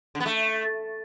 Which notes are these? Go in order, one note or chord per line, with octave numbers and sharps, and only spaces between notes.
D3
B3
A3